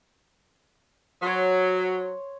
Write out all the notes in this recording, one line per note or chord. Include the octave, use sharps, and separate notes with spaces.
F#3 C5 C#5